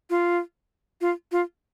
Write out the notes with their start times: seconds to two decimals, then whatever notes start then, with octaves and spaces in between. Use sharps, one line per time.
0.10 F4
1.01 F4
1.32 F4